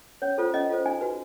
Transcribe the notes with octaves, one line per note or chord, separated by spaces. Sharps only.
C#4 C#5
F4 A4 C5
C#4 D#5
F4 A4 C5
D#4 G#5
F#4 B4